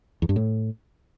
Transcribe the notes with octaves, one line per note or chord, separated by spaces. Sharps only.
E2
G2
A2